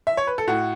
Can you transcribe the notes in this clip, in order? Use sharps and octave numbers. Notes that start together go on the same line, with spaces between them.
E5
C#5
B4
A4
A2 F#4